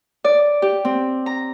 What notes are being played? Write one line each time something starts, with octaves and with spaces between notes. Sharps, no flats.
D5
G4
C4
A#5